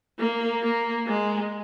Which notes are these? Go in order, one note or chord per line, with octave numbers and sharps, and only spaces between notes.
A#3
A#3
G#3